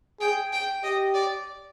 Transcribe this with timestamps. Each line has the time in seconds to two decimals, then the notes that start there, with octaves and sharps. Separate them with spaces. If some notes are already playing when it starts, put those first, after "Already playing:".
0.21 G#4 G5
0.53 G5
0.84 G4 D#5
1.15 D5